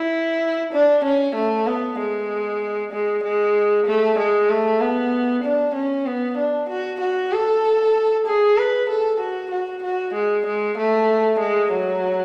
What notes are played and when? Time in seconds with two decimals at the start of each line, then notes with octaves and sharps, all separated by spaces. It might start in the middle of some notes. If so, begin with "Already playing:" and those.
Already playing: E4
0.73 D4
1.04 C#4
1.35 A3
1.67 B3
1.99 G#3
2.92 G#3
3.23 G#3
3.86 A3
4.18 G#3
4.50 A3
4.80 B3
5.43 D4
5.74 C#4
6.06 B3
6.37 D4
6.69 F#4
7.00 F#4
7.32 A4
8.26 G#4
8.57 B4
8.89 A4
9.20 F#4
9.51 F#4
9.83 F#4
10.14 G#3
10.46 G#3
10.77 A3
11.39 G#3
11.72 F#3